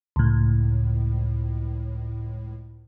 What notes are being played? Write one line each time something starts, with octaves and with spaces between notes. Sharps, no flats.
C#2 A2